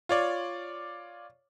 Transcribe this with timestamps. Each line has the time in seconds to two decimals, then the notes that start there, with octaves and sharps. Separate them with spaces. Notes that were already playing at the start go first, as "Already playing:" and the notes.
0.09 F4 C#5 D5